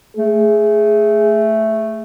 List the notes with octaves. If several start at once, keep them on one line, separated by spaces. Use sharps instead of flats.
A3 G#4